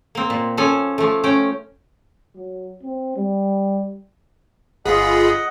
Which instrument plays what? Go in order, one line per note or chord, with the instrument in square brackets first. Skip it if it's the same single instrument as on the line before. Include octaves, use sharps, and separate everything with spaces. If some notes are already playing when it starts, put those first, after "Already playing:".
[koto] A#3 C4
A#2
F3 C#4 A4 G#5
F3 A3
C#4 G5
[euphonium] F#3
C4
G3
[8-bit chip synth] G1 G#4 [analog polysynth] F4 B5 [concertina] D#5 F#5